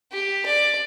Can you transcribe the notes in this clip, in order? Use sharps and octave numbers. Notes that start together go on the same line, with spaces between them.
G4
D5